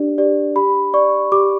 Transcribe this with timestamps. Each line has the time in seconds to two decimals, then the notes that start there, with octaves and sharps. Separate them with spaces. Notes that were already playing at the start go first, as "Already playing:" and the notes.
Already playing: D4 G4 D5
0.18 G4 D5
0.56 G4 B5
0.94 D5 C#6
1.32 G4 D6